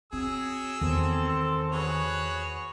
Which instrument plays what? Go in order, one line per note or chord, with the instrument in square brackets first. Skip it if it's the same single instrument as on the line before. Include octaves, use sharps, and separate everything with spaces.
[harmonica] F#3 G#4 E6 [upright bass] C4
[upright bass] E2 [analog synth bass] D#3 [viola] C4 A4
[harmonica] F#4 G#4 B4 [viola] C#5